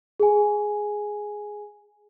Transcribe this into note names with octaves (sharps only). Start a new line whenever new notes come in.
G#4 G#5